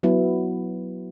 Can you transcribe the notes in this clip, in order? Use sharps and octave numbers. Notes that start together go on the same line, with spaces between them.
F#3 B3 E4